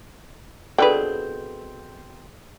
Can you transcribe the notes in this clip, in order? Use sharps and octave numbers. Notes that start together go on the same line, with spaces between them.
B2 F3 C4 D4 G#4 A4 B4 G5